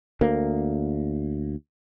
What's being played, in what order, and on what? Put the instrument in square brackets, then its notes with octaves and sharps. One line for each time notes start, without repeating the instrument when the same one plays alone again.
[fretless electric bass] D2 A#3